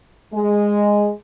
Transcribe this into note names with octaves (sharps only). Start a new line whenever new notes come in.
G#3